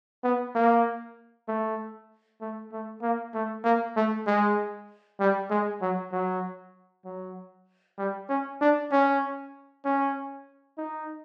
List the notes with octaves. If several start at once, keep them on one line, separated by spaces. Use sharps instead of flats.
B3
A#3
A3
A3
A3
A#3
A3
A#3
A3
G#3
G3
G#3
F#3
F#3
F#3
G3
C#4
D4
C#4
C#4
D#4